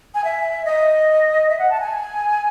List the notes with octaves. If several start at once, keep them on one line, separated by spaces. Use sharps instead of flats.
G#5
E5
D#5
E5
F#5
A5
G#5